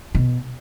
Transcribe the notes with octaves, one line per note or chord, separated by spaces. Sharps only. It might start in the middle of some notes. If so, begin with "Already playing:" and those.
B2